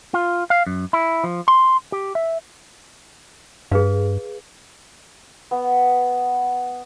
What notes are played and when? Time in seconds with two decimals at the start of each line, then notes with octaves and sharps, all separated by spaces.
0.14 F4
0.50 F5
0.67 F#2
0.93 E4
1.24 F3
1.48 C6
1.92 G4
2.15 E5
3.71 G2 G#4 B4 F5
5.51 B3